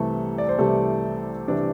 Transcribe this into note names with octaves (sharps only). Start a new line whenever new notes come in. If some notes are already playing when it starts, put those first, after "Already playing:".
Already playing: C2 C3 E3 G3 A3 A4
D5
C5
C2 C3 E3 G3 A3 A4
C3 E3 G3 D4 D5